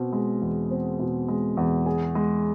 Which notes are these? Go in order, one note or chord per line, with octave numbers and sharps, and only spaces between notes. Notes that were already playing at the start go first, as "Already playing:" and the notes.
Already playing: B2 C4
G#3
E2
C4
B2
G#3
E2
G#4
G#3